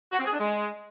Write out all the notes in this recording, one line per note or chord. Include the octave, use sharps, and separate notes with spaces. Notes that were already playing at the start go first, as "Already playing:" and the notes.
F#4
C4
G#4
D4
G#3